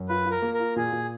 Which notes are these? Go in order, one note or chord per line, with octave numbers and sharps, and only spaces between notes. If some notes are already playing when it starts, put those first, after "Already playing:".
Already playing: F#2
F4 B4
F4
A#4
A#3
A#4
F4
A#2 G#4
A#2